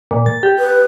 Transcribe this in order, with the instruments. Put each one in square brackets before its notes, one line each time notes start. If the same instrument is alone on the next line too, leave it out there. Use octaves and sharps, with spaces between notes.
[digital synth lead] A#2
A6
G4
[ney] B4